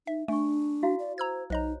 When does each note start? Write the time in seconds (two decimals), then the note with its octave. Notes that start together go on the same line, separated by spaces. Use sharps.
0.07 D#4 E5
0.28 A3 D4 G#5 C#6
0.83 E4 F#4 F5
0.99 D5
1.18 C5 A#5 E6 G#6
1.50 B1 D#4 C5 C#5 D#5 A#5